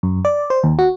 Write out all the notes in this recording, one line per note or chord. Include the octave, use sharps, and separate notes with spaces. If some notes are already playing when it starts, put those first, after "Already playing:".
F#2
D5
C5
D#2
F#4